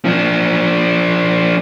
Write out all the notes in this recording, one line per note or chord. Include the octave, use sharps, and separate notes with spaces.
F3 D4